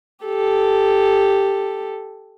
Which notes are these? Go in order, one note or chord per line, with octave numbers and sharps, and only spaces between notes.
G4 A4